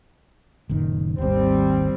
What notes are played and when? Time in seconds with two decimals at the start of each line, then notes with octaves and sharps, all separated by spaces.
0.69 F#1 A#2 D#3
1.18 G#1 D#2 G3 C4